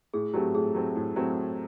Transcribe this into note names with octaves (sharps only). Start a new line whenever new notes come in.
A2 G#4
F#3 A3 C4 G4
A2 G#4
F#3 A3 C4
A2
F#3 A3 C4